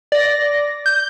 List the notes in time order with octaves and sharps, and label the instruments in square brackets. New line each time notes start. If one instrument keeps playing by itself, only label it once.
[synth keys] D5 A#6
G6